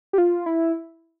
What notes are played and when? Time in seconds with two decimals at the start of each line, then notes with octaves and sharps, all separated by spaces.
0.13 G4
0.18 F4
0.46 E4